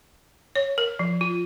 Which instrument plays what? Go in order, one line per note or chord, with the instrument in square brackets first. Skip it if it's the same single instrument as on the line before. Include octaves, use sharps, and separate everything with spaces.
[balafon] C#5
A#4
F3
F4